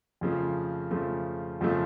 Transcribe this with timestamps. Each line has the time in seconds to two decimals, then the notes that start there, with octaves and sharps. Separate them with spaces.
0.21 F2 C#3 F3 A3
0.91 F2 C#3 F3 A3
1.61 F2 C#3 F3 A3